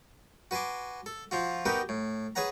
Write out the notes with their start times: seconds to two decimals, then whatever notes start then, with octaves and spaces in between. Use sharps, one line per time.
0.51 F#4 B4 G#5 C6 D6
1.06 A4
1.31 F3 F4 F#4
1.65 B3 D#4 F#4 G4 A#4 B4
1.89 A2
2.35 G#4 B4 C#5 F#5 A#5